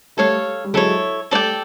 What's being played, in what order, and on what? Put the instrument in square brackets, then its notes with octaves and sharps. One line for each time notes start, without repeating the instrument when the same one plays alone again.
[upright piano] G3 A3 [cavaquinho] A4 C#5 F5
[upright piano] G3
[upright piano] F#3 G#3 [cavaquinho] E4 A4 C#5
[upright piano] G3 A3 [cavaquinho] A4 D5 G5